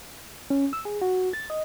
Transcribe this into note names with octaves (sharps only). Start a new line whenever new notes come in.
C#4
E6
G#4
F#4
A6
D#5